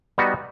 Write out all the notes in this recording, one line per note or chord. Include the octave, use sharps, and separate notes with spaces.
G3 B3 D#4 F#4